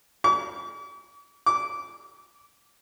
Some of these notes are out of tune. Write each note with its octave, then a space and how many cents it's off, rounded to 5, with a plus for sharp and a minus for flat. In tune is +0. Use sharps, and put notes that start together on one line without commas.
D6 -45
D6 -20